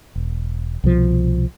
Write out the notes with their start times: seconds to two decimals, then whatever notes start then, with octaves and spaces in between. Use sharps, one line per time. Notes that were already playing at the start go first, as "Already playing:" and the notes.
0.16 E1
0.84 C2 B2 F3